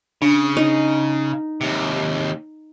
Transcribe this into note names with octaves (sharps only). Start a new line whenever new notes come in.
C#3 D4
D#4
D#2 C3